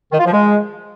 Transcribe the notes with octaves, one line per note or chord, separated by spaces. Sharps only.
D#3
F4
F3
G#3